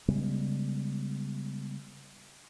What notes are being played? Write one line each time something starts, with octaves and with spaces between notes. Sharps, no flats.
C#3 G3 G#3 B3